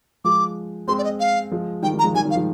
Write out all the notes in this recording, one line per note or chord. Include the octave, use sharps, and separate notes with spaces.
F3 G#3 D6
G#3 C4 C6
D5
D#5
F5
F3 G#3
D#3 G3 G5
D#3 G3
A#5
F3 G#3
D#3 G3 G#5
D#3 G3
F5
F3 G#3